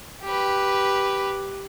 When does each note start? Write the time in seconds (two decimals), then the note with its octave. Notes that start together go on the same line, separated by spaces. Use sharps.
0.23 G4 B4